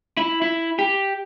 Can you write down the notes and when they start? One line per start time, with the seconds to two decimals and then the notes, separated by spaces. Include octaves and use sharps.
0.17 E4
0.42 E4
0.79 G4